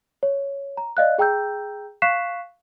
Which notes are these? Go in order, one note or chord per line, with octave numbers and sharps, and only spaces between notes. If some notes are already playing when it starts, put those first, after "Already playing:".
C#5
A#5
D5 D#5 F5 F#6
G#4 G5 A#5 E6 G6
F5 C#6 F#6 B6 C7 E7